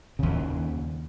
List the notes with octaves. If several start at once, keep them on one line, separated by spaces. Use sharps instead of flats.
D#2 C#3